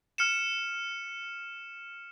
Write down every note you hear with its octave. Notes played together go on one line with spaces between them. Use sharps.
F6 C#7 E7